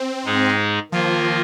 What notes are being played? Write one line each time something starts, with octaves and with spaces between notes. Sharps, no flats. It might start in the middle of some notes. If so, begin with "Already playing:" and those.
Already playing: C4
G#2 G#3 D#4 G#4
D#3 F3 A#3 F4 A#4